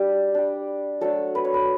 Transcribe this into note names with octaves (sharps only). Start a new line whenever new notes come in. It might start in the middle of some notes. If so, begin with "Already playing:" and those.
Already playing: G3 D4 G4
G3 D4
F#3 A3 D4 A4
B4
C#5
B4